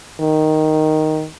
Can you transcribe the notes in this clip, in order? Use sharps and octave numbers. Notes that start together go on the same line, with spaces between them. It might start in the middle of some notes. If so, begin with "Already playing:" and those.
D#3